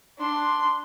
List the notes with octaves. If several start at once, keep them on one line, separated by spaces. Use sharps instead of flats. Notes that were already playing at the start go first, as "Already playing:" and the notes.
D4 C6